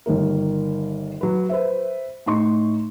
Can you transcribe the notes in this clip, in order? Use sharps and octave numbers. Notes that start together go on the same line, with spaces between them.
G1 D#3 A#3 A#4
F#3 B4
B4 C5 E5
A2 D#4 C6 C#6